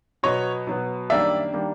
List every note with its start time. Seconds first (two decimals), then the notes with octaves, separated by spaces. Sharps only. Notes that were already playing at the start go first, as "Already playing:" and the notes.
0.23 B2 F#3 B3 C#5 D#5
0.67 B2 F#3 B3
1.10 F#2 D#3 G3 A#3 D4 D5 E5
1.54 D#3 G3 A#3 D4